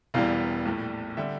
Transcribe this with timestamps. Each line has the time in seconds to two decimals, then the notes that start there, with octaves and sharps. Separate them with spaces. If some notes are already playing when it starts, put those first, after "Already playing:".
0.14 E1 E2 E3 G3 F5
0.65 A#1 A2 G3
1.17 D3 G3 E5